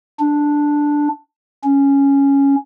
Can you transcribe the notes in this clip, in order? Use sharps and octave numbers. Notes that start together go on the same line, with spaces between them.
D4
C#4